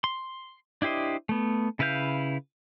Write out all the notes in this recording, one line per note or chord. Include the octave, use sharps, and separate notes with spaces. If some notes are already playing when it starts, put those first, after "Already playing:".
C6
D4 E4 G4 C5 D#5
A3 B3
C#3 E4 B4 F5 G6